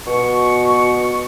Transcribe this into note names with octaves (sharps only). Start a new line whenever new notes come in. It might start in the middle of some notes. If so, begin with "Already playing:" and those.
B2 C#6